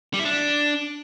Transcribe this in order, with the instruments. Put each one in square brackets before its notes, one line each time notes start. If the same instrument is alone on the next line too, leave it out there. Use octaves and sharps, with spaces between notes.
[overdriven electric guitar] G3
E4
D4